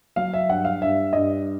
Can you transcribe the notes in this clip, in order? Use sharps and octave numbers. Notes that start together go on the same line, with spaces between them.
F#3 F5
E5
G2 F#5
F5
G2 E5
G2 D#5